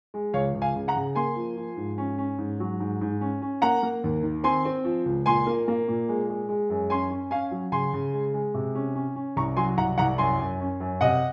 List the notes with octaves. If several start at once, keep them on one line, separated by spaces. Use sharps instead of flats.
G#3
C#2 C#5 F5
C#2
F5 G#5
C#3
F#5 A#5
C#3
A#3 G#5 C6
F3
F3
G#2
C#4
C#4
G#2
F#3
G#2
G#2
C#4
C#4
A#3 F#5 A#5
A#3
D#2
D#3
C4 G#5 C6
C4
F3
C#2
A#2 G#5 C6
A#3
A#3
A#2
G#3
G#3
G#3
F#2
C#4 G#5 C6
C#4
C#4 F5 G#5
F#3
C#3 G#5 C6
C#3
G#3
G#3
C3
C#4
C#4
C#4
C2 A#5 C#6
F#3 G#5 C6
C2 F#5 A#5
C2 F#5 A#5
F#2 G#5 C6
F#2
C#4
F#2
C3 D#5 F#5